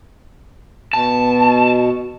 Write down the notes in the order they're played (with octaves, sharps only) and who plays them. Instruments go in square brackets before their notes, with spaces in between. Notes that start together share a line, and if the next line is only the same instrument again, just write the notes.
[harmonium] B2 [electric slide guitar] A5